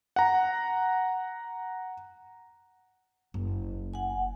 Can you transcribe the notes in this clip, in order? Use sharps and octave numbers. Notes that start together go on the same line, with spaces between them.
F#5 A#5
F#1
F#5 G#5